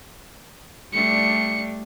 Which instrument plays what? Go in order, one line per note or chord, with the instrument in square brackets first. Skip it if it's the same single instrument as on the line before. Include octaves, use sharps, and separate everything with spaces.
[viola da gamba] G3 A3 D4 [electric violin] C#7